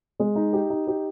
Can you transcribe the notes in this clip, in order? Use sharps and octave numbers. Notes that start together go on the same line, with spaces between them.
G#3
D#4
G4
D#4
G4